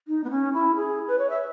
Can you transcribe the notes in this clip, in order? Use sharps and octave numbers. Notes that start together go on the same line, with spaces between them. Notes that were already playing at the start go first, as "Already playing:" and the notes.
D#4
B3
C#4
E4
G#4
B4
C#5
E5